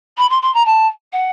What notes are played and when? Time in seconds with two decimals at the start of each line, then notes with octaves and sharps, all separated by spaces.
0.18 B5
0.29 C6
0.42 C6
0.54 A#5
0.65 A5
1.12 F#5